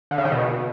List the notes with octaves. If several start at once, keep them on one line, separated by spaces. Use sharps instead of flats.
D3
C#3
D#3
B2